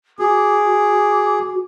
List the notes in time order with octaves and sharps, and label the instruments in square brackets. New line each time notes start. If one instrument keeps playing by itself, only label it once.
[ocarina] F#4 [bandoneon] G#4 [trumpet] D6